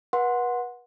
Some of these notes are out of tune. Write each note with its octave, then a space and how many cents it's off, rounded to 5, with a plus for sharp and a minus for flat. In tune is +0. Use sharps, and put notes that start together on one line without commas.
B4 -35 F#5 -15 C6 +0